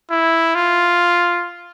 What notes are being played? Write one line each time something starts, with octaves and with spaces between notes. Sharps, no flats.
E4
F4